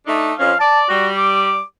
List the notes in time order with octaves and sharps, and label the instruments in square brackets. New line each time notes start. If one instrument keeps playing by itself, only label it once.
[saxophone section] A3 D4 D#4
[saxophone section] F2 F3 C#4 [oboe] F5
[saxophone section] D5 [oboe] A5
[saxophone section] G3 [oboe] F#4
[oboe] D6